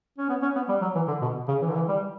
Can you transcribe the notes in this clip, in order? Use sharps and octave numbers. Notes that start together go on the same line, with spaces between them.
C#4
B3
C#4
B3
G3
F#3
E3
D3
B2
C#3
E3
D3
E3
G3